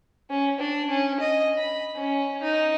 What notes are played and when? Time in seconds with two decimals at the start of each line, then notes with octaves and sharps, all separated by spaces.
0.30 C#4
0.59 D4
0.90 C#4
1.20 D#5
1.58 B5
1.96 C#4
2.42 D#4